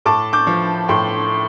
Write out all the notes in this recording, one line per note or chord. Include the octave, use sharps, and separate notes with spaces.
A2 A5 D6
D6 G6
F3
A2 G5 C6